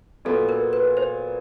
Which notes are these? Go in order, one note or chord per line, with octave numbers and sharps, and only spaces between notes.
A#2 F#3 B3 A4
A#4
B4
C5